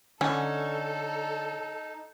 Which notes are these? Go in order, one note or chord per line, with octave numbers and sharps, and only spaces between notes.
D3 C#4 D#4 A4